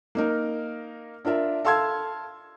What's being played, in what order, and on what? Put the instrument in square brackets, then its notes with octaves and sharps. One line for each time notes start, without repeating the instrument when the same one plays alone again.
[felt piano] A#3 D#4 A#4
D4 F4 A#4 E5
A4 F5 A5 C6 E6 G#6